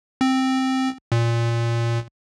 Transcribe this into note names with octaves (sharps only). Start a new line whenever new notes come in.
C4
A#2